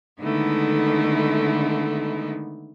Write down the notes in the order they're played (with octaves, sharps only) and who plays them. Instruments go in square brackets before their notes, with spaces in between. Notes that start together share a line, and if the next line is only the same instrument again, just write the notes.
[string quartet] D3 D#3 G#3 A3 B3 E4